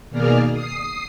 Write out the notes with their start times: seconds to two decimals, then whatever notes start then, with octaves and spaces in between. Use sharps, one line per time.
0.10 B2 D#3 A#3 G#4 D5 F6
0.51 D#6 C7